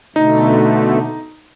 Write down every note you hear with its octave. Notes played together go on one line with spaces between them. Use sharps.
B2 D3 A3 D#4